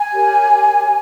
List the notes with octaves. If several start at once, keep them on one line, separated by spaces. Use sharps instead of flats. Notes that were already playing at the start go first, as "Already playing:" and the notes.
Already playing: G#5
G4 A#4 C#5
G4 A#4 C#5